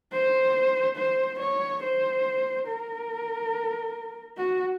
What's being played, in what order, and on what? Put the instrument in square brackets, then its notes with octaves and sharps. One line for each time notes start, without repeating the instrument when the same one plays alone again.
[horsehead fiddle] C5
C5
C#5
C5
A#4
F#4